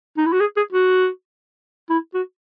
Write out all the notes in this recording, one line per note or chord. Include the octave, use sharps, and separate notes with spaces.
D#4
E4
F#4
G#4
G#4
F#4
E4
F#4